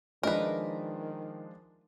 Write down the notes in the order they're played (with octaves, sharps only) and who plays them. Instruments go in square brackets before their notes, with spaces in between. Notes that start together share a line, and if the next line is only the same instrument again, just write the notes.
[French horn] D#3 [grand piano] F3 G#3 D4 [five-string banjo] A#4 B4 [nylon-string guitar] D#5 E5